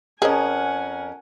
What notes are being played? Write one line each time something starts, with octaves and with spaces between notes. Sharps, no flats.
F2 C#4 G#4 A#4 D#5 F#5 G#5